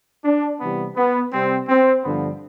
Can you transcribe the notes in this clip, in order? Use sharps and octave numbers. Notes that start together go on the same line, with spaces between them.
D4
C3 E3 G3 B3
B3
C3 G3 C4
C4
G2 D3 F3 B3